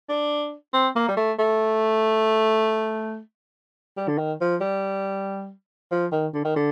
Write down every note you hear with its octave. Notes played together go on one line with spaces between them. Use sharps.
D4
C4
A#3
G3
A3
A3
G3
D3
D#3
F3
G3
F3
D#3
D3
D#3
D3